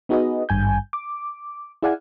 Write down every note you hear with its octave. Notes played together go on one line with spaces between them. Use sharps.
B3 D#4 F#4 G#4 B4 D#5
G#1 G2 G#5 G6
D6
E4 G#4 D5 F5 F#5 G#5